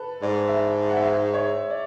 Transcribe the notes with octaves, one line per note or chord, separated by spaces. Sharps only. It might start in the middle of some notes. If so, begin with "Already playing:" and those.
Already playing: A4 B4
G#2 D5
E5
F#5
E5
C#5
D5